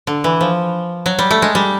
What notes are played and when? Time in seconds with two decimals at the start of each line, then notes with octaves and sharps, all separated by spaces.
0.07 D3
0.24 E3
0.41 F3
1.06 F#3
1.19 G3
1.31 A3
1.42 G#3
1.55 G3